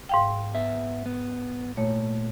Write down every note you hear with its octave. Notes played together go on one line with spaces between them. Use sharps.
G#2 F5 G5
B3 E5
B3
A#2 A3 C#5